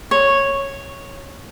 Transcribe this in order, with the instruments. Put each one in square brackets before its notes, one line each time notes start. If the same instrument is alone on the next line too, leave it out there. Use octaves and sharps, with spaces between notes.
[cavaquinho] C#5